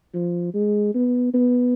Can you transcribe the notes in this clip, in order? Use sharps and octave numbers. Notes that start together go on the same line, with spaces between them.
F3
G#3
B3
B3